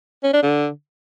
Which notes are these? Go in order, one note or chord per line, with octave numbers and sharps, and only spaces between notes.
C#4
D4
D3